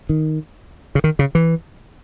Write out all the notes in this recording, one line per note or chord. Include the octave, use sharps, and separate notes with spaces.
D#3
C#3
D#3
C#3
E3